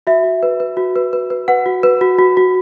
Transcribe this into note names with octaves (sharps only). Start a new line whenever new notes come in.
F#4 E5
F#4
B4
B4
F#4
B4
B4
B4
B4 F#5
F#4
B4
F#4
F#4
F#4